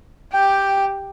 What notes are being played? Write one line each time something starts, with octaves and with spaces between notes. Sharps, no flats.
G4 G5